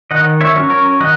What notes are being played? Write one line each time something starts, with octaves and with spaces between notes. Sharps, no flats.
D#3 D#5 F#5
C#5 E5
F#3 C#4
A#4 C#5
D#3 D#5 F#5